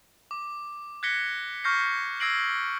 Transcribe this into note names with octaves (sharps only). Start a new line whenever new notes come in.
D6
F#6 G#6 A#6 B6 C#7 G7
C#6 F6 G6 A#6 C7
E6 G#6 A#6 C7 D7 F#7